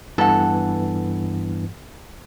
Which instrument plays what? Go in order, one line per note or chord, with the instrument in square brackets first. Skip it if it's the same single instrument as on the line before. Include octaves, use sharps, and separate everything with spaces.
[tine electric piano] G2 E3 B3 [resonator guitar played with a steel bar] A4 F#5